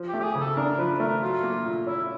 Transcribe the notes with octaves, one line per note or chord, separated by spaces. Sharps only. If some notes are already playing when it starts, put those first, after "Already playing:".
Already playing: F3
G4
A3
G4
G#4
C#3
A4
D4 A#4
F3 B4
A3 A#4
F#3 F4
A#3
A#2
C#4 E4